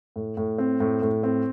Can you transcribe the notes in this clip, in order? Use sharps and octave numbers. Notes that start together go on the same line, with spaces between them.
A2
A2
C4
A2
A2
C4